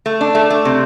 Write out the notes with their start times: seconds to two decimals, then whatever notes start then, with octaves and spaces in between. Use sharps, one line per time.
0.06 A3
0.21 D4
0.35 A3
0.50 A3
0.65 C3